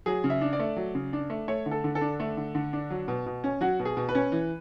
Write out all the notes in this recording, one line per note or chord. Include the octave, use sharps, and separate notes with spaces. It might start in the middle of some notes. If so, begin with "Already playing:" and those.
F#3 G#4
C#3
E5
D4
D5
A3
F#3
C#3
D4
A3
A3 C#5
D3
A4
D3
A4
D4
A3
D3
D3
D4
F#3
B2
B2
C#4
F#3 F#4
B2
G#4
B2
B4
C#4
E3